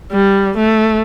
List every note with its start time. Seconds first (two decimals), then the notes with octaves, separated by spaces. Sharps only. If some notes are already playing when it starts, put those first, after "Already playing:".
0.12 G3
0.57 A3